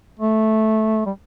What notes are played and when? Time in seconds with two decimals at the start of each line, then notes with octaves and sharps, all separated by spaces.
0.20 A3
1.06 G3